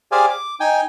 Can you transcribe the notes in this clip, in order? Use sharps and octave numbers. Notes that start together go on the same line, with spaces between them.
G4 G#4 C5 D5 F5 G#5
D6
D#4 G5 G#5